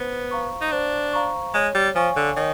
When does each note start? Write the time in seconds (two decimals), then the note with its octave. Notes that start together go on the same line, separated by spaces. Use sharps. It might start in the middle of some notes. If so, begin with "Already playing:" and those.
Already playing: B3 C5
0.31 F5 A#5 C#6
0.61 D#4
0.72 D4 C5
1.13 F5 A#5 C#6
1.54 G#3 C#5
1.75 G3
1.95 F3 F5 G#5 C#6
2.16 D3
2.37 D#3 C#5